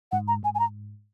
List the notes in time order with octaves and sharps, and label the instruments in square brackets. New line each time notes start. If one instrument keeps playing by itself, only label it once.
[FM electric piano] G#2 [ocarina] F#5
[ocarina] A#5
[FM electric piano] G#2 [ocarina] G#5
[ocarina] G#5
A#5